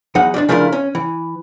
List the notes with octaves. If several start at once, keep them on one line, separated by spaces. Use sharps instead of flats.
E2 F#3 D#4 F#5
G3 D4
C#3 F3 A3 D4 E4 A#4
C#4
E3